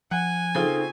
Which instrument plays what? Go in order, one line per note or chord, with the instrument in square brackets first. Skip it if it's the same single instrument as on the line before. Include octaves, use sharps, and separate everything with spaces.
[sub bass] F3 [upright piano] F#5 [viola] G#5
[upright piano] C#3 C4 F4 [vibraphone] D#4 A4